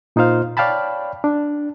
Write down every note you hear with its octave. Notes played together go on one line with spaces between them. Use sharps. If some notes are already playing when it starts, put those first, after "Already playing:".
A#2 D#4 F4 C5 F5
C#5 D5 F5 G5 A5 B5
D4